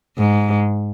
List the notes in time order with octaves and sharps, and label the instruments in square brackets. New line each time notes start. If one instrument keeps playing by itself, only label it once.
[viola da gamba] G#2